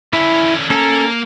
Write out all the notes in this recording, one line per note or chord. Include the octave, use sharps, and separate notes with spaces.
D3 C#4 E4
A#3 C#4 A4 A#5